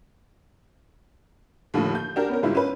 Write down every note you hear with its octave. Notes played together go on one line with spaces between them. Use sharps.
D#2 A2 D3 F3
G6
D4 F#4 G4 A#4
B3 C#4 A#4
G1 G#2 G3 E4 F4
C#4 B4